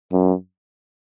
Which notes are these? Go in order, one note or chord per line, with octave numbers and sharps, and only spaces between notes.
F#2